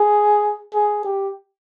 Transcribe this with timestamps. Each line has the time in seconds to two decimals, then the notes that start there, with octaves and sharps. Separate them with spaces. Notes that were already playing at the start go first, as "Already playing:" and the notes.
Already playing: G#4
0.74 G#4
1.04 G4